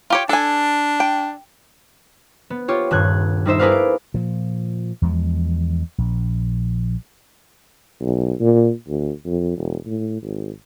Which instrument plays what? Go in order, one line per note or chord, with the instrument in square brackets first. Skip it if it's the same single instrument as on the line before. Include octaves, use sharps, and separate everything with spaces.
[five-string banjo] F4 G4 C#5
[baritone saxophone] D4 [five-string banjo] A4 G#5
[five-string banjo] G5
[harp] B3
F4 G4 C#5
D#1 G2 F#6 G#6
G3 D#4 C5 E5
E4 G#4 A#4 B4 D5 F5
D7
[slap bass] A#2 F3
E2 F3 G#3
A#1
[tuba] B1
A#2
D2
F2
E1
A2
G#1